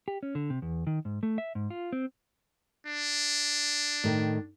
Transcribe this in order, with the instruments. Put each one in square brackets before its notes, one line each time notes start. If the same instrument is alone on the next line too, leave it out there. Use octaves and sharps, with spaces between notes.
[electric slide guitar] G4
C#4
D3
C3
E2
D#3
G#2
A3
E5
G#2
F4
C4
[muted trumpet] D4
[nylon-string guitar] A2 D#3 A#4